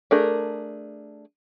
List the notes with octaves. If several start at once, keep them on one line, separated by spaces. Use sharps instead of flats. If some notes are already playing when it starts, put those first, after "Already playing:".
A3 D4 G#4 A#4